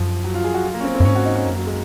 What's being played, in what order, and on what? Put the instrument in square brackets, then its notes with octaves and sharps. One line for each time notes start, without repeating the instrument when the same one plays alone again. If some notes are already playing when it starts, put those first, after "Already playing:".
Already playing: [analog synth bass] F#2 [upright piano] F3
[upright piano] F#3
F4
G#4
F#4
F4
A#3
C#4
C4
C4
[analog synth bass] F#2
[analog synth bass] G#2 [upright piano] C#4
[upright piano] F#4
D#4
C#4
[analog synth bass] F#2 [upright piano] A#3
[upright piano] F#3
G#3